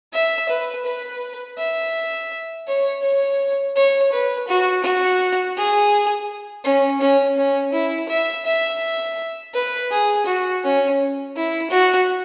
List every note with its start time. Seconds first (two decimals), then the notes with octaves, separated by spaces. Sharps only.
0.13 E5
0.49 B4
0.85 B4
1.58 E5
2.67 C#5
3.02 C#5
3.76 C#5
4.12 B4
4.48 F#4
4.84 F#4
5.57 G#4
6.64 C#4
7.01 C#4
7.38 C#4
7.73 E4
8.09 E5
8.45 E5
9.53 B4
9.91 G#4
10.26 F#4
10.63 C#4
11.36 E4
11.71 F#4